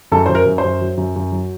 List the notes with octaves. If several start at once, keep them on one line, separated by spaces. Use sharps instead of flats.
F#2 A4
F#2 C5
A#4
F#2
C5
F#2
F#3
F#2
F#2
F#3